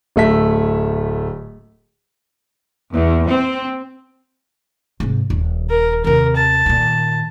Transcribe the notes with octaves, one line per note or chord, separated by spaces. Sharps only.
D1 A3 E5 B6
E2
C4
G#2 C3
D#1
A#4
D#2 C3 A#4
A5
A#2 D#3